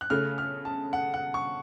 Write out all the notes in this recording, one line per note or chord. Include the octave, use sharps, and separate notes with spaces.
F#6
C#3 A3 C#4 F6
F6
A5
F#5
F#5
C#6